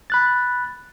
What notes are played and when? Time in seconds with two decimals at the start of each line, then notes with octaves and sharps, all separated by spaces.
0.10 B5 F#6 A6